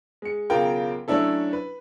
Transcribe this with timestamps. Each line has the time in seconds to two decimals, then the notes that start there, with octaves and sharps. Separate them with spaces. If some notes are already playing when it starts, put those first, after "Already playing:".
0.22 G#3 C#7
0.50 B1 C#3 F4 A#4 G5
1.08 F#3 A3 C#4 D4 E4 A4
1.53 B4